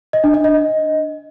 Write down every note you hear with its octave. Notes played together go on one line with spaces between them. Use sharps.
D#5
D4
D#5
D#5